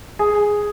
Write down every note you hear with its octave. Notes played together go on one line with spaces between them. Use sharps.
G#4